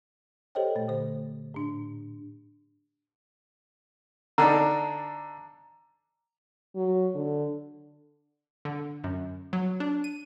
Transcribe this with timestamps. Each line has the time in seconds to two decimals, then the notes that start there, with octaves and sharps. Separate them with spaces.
0.55 G4 A4 C5 C#5 D#5 G5
0.75 A#2 A3
0.88 D3 C5
1.54 A2 D4
4.38 D3 D4 D#4 A#5
6.75 F#3
7.15 D3
8.65 D3
9.04 F#2
9.53 F#3
9.80 D4
10.04 D#7